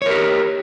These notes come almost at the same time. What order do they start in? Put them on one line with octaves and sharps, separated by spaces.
C#5 A#4 G4